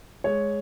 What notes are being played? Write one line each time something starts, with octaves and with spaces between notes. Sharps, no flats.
G#3 C#5